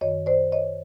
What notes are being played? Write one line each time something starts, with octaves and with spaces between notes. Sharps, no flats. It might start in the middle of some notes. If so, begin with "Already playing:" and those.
F#2 D#3 C#5 D#5
C5 D5
C#5 D#5